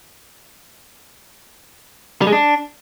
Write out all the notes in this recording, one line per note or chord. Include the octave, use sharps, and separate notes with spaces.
G3
G#3
D4